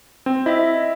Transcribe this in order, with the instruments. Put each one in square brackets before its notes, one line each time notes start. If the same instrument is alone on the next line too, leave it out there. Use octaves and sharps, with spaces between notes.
[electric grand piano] C4
[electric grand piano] E4 [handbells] D#5 E5